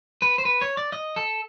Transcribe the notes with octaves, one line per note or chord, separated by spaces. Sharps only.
B4
C5
B4
C#5
D5
D#5
A4